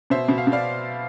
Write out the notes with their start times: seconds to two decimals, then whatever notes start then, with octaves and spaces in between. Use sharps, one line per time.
0.10 B2 C5 E5
0.28 B2
0.38 F5
0.47 B2
0.52 D5 F5